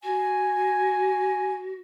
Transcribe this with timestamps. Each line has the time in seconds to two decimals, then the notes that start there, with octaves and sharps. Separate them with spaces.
0.03 F#4 G#5